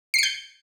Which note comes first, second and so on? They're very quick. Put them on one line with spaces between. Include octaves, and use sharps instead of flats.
C7 C#7 G6